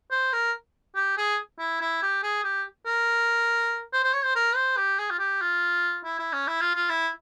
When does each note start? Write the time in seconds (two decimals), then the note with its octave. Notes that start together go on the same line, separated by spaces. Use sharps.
0.11 C5
0.33 A#4
0.95 G4
1.17 G#4
1.59 E4
1.81 E4
2.02 G4
2.23 G#4
2.44 G4
2.86 A#4
3.93 C5
4.03 C5
4.14 C#5
4.24 C5
4.36 A#4
4.56 C5
4.77 G4
4.99 G#4
5.11 F4
5.19 G4
5.42 F4
6.04 E4
6.19 E4
6.33 C#4
6.47 E4
6.61 F4
6.75 F4
6.89 E4